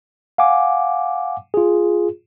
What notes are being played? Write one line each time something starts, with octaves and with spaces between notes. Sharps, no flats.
F5 F#5 G#5 D6
F4 G#4